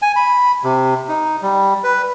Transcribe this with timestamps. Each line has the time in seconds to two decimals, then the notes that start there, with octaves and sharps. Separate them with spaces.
0.02 G#5
0.16 B5
0.63 C3
1.09 D#4
1.42 G3
1.84 B4